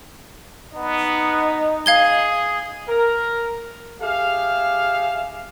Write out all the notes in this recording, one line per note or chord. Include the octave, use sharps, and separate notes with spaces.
B3 D#4
G#4 F5 G#6 G7
A#4
G4 G#4 E5 F5